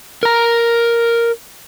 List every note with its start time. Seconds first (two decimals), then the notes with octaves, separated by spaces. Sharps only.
0.23 A#4 A#5